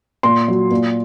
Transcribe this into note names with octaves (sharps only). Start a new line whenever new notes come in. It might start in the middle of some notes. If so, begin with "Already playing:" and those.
A#2 C6
F#3
A#2